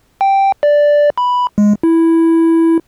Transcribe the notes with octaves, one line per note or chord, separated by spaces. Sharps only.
G5
D5
B5
G#3
E4